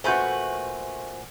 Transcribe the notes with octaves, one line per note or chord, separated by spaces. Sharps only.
A#2 A3 F#4 B4 C5 G#5 G6